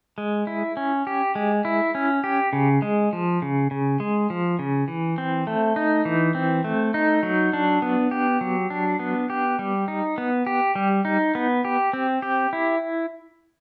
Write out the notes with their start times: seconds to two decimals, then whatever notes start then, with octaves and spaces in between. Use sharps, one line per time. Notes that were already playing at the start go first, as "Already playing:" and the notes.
0.18 G#3
0.47 E4
0.77 C#4
1.07 G4
1.35 G#3
1.65 E4
1.95 C#4
2.24 G4
2.53 C#3
2.82 G#3
3.13 F3
3.42 C#3
3.71 C#3
4.00 G#3
4.30 F3
4.59 C#3
4.88 E3
5.18 C4
5.47 A3
5.76 D#4
6.05 E3
6.35 C4
6.64 A3
6.94 D#4
7.23 F#3
7.53 D4
7.82 B3
8.11 G4
8.41 F#3
8.70 D4
8.99 B3
9.30 G4
9.59 G3
9.88 D#4
10.18 B3
10.47 G4
10.75 G3
11.05 D#4
11.35 B3
11.65 G4
11.93 C4
12.22 G4
12.53 E4